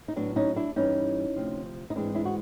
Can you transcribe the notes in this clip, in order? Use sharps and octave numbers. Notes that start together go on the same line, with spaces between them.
D#4
A2 F#3 B3 D4
C#4 D#4
D4 E4
G2 E3 G3 C#4 D#4
D2 C3 F3
D#4
G#2 E3 G#3 C4 D4
D4 E4
F#4